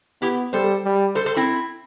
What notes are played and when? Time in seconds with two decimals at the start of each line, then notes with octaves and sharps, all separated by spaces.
0.22 B3 E4 G4
0.53 G3 A4 C5
0.85 G3
1.15 A4 C5
1.26 A4 C5
1.36 C4 E4